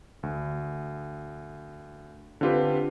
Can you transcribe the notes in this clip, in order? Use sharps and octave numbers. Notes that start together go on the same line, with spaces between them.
D2
D3 C4 F4 G4 B4